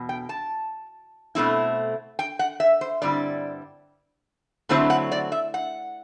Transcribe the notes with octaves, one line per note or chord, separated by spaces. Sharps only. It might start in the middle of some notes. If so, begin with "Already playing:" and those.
Already playing: E2 B2
G5
A5
B2 A3 C4 E4
G5
F#5
E5
C5
G2 D3 G3 C4 E4 D5
D3 F#3 A3 C4 E4 C5
F#5
D5
E5
F#5